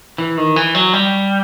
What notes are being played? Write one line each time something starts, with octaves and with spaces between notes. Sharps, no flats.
E3
D#3
E3
F#3
G3